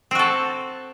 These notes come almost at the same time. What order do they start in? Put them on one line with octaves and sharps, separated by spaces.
C4 F#4 A4